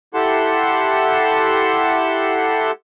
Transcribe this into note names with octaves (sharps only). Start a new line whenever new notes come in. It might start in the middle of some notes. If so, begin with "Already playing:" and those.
E4 G4 A4 F#5 A5 C6